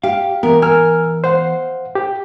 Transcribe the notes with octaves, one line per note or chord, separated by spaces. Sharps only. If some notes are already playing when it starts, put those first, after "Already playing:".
G4 F5
E3 B3 A#4
A#4 G#5 E6 F6
C5 F5 F#5
G4